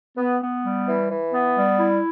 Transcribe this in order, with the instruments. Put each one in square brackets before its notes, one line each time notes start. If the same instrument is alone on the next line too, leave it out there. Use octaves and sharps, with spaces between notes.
[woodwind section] B3
B3
G3
E3
E3
B3
G3
E4